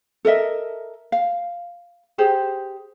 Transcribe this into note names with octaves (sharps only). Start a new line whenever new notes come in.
A4 A#4 D#5 E5
F5
G4 G#4 C5